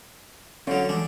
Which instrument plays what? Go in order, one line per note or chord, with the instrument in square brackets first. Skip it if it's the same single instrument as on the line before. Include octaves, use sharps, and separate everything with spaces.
[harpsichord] D3 F#3 [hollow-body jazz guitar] C#4 D5 F5
[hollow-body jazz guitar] E3 G#3 [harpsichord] D4